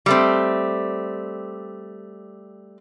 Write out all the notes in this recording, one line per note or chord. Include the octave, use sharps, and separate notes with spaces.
G3 A3 C4